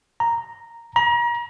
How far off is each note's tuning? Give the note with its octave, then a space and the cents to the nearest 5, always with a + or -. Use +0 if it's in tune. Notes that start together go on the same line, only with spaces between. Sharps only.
A#5 -5
A#5 +35